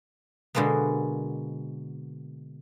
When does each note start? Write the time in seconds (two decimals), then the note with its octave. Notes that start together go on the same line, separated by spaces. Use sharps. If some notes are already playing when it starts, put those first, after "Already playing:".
0.55 B2 D3 G#3 A#3 B3